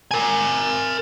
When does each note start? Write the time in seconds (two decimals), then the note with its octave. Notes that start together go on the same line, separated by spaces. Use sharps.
0.11 A#4 G#5